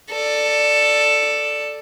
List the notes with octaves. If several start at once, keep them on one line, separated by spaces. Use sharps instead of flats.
A4 D5